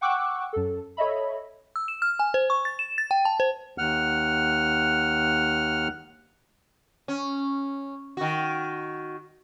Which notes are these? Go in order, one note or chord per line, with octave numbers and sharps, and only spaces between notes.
F#5 G5 C#6 D6 E6 F#6
F#2 A4
A4 C#5 D#5 E5 B5
E6
E7
F6
G#5
C5
C#6
A6
E7
A6
G5
A5
C5
D#2 F#5 F6
C#4
D#3 F#4